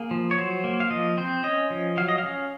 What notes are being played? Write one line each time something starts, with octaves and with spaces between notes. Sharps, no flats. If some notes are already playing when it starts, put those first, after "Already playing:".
Already playing: A#3 G#4
F3
C#5
F#3 C5
A#3
F5
F3 D#5
C4 C5
C#4 D#5
F3
F#3 F5
D#5
F5
C#4